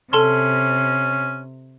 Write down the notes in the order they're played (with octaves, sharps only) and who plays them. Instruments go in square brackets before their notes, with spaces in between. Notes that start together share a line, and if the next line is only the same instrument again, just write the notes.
[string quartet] C3 [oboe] C#4 [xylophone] A4 A5 C6